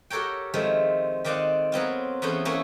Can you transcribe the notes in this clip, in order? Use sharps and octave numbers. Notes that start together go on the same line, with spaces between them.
F#4 G4 A4 A#4 C#5 G5
D#3 F3 G#3 A3 C4
D#3 C4 D5 D#5 F5 F#5
F#3 B3 C4 F4
E2 A3 B3 C#4 C5 C6
A3 A#3 C#4 E4 G#4